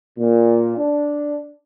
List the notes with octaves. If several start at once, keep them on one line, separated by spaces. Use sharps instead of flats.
A#2
D4